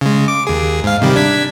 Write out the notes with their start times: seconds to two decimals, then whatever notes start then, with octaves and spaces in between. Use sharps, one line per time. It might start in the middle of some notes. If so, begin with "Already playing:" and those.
0.01 C#3 G#3
0.28 D6
0.47 D#2 G#4
0.84 G#2 F5
1.02 C3 D#3 G3
1.16 D4 G#6 B6